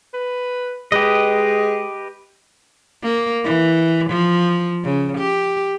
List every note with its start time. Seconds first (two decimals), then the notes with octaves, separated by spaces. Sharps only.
0.14 B4
0.92 G#3 G4 B4 D#5
3.03 A#3
3.45 E3
4.10 F3
4.84 C#3
5.18 G4